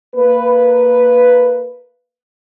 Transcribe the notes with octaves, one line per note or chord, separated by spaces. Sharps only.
A#3 B4